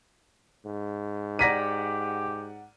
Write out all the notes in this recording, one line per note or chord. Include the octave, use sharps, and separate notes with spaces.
G#2
G4 D5 F#5 A#5 A#6 B6 D#7